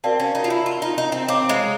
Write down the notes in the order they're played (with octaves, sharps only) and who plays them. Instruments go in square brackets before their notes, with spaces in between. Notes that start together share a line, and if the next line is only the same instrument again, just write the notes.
[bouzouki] C4 [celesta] F#4 A#4 D5 F5 A5
[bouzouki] C#4
D#4
F4
E4
F4
D#4
D#4
C4
[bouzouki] C4 [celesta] C#5 F5 A#5 D6
[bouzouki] G#3